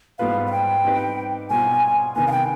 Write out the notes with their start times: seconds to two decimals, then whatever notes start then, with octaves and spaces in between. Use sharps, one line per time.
0.18 G#2 G3 B3 F4 B4 F5
0.46 F5
0.52 G5
0.84 G3 C4 D#4 G4 B4
1.50 B2 G3 B3 F4 C5 G#5
2.15 C3 D#3 B3 G#5
2.27 F5
2.32 G5